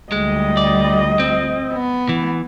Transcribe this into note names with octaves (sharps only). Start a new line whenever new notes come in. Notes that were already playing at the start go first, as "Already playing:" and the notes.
D2 G3 G#3 D#5
D5
C4
B3
E3